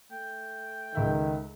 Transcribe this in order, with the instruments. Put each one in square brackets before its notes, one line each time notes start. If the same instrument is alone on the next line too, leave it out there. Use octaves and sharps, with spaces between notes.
[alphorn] A3 [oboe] G5
[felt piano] C#2 E5 [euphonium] D#3